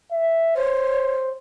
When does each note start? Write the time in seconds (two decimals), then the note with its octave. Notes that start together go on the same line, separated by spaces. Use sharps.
0.12 E5
0.57 C5 C#5